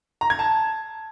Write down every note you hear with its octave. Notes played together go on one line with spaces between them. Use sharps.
A#5
G#6
A5